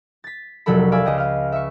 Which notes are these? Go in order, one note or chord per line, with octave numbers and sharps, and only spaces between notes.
A6 B6
F1 C2 F#3 A3 A4 B5
D5 F5 G#5 B5 D6 E6
C#2 D#5 G5
F5 F6
E5 C#6